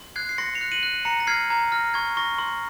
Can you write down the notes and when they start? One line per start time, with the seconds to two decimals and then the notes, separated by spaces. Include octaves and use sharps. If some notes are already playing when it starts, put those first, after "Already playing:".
Already playing: C6
0.16 F#6 G#6 C7
0.29 C7
0.38 C6 A#6 C#7
0.55 C#7 F7
0.61 F#6
0.72 D#7 F#7
0.83 F#6
1.05 A#5 A#6 C#7
1.20 A#6
1.27 F6 G#6 C7
1.50 A#5 G#6
1.72 F6 A#6
1.94 C#6 G#6
2.17 C#6 A#6
2.39 C6